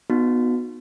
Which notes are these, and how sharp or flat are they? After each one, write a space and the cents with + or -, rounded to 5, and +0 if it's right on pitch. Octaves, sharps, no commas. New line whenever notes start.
B3 +0 D#4 -20 F#4 -30